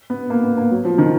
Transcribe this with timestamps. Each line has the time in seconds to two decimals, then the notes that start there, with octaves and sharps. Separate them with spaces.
0.10 B3
0.30 A#3
0.44 B3
0.57 A#3
0.71 F#3
0.85 F3
0.98 D#3